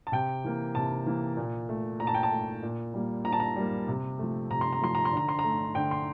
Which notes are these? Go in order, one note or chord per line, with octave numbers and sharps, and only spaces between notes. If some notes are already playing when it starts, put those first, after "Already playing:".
A5
C3 G5
E3 A#3
C3 A5
E3 A#3
A#2
A3
A#2 A#5
A5
G5
A5
A3
A#2
G3 A#3
A#2 A#5
A5
A#5
G3 A#3
C3
F3 A3
C3 A#5
C6
A#5
F3 A3 C6
A#5
C6
D3 A#5
C6
A#5
A3
D3 G5
C6